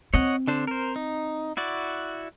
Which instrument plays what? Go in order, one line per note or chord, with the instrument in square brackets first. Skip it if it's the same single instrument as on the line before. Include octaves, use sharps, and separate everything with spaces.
[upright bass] C4 [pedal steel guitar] C#5 D#5 F#5
[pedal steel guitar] D3 D4 C5
A#4 C5
D#4
E4 F#4 D5